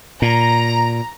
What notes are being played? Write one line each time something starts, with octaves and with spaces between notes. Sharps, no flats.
A#2 A#5